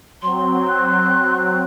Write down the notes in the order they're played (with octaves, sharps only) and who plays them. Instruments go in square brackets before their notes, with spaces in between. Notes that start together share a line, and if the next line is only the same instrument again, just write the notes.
[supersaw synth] F#3 C4 [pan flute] C6
[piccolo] F#6